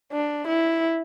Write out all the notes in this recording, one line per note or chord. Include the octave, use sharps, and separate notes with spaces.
D4
E4